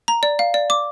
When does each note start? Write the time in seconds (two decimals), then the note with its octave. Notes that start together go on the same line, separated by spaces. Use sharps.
0.08 A#5
0.23 D5
0.39 F5
0.54 D5
0.70 D6